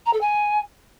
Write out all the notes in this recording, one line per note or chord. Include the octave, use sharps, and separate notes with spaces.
A#5
A4
G#5